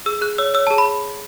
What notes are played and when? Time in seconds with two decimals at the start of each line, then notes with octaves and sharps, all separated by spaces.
0.06 G#4 E6
0.21 G#4 F#6
0.38 C#5 E6
0.54 C#5 E6
0.67 A5
0.70 G#4
0.78 B5